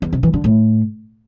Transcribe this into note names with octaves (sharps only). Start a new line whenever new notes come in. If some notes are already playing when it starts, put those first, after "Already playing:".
E2
C3
E3
D3
A2